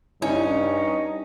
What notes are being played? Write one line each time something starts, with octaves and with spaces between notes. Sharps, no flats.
G2 C#4 D#4 E4